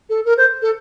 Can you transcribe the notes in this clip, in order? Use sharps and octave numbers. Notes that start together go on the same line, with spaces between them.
A4
A#4
C5
A4